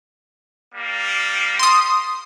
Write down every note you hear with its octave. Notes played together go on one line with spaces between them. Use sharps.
G3 A#3
C6 D#6